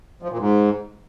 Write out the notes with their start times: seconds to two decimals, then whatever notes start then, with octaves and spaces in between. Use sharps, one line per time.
0.23 F3
0.31 A#2
0.39 G#2